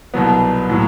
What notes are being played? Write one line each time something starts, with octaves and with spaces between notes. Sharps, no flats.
C2 B2 F#3 B3
A2 F#3